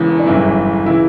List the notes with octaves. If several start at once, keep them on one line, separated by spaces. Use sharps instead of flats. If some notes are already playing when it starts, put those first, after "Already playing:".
Already playing: E1 E2 C#3 E3
D4
G1 F#2 C#3 E3 E4
C#3 E3 E4